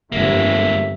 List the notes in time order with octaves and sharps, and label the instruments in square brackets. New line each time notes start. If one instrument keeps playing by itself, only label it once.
[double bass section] G1 F2 [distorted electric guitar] G#3 A#3 [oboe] E5